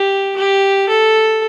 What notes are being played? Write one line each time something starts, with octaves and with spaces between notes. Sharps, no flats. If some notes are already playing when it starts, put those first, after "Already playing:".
Already playing: G4
G4
A4